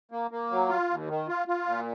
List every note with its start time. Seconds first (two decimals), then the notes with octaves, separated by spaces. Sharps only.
0.11 A#3
0.31 A#3
0.51 F#3
0.69 F4
0.90 D#2
1.09 D#3
1.28 F4
1.48 F4
1.66 A#2